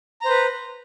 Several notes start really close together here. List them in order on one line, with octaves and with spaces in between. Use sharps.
A#5 C5 B4